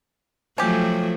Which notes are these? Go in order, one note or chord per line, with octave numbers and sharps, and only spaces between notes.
F3 F#3 A3 C#4 G4